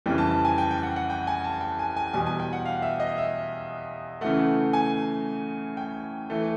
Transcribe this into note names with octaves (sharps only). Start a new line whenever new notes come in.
F2 C#3 E3 G3
A5
A5
G#5
G5
G5
F#5
F#5
G5
G#5
A5
G5
G#5
G#5
E2 B2 G3 G#5
G#5
G5
F#5
F5
E5
D#5
E5
C#3 E3 A3 F#5
G#5
G5
E3 A3